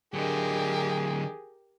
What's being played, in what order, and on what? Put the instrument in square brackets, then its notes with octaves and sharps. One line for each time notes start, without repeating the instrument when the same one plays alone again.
[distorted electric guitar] D3 F#3 [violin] G4 A#4 [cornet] G#4